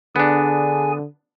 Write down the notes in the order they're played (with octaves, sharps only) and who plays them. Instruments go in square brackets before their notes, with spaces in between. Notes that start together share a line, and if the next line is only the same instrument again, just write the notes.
[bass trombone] D3 [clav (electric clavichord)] B3 D4 [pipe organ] G#4 G#5